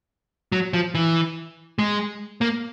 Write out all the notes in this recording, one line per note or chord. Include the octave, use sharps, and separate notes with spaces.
F#3
F3
E3
G#3
A#3